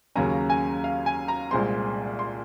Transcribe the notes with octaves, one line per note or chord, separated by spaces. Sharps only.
D#2 C#3 F#3 A#3 C#4 A#5
G#5
F5
G#5
A#5
C2 A#2 G#3 C4 C6
C6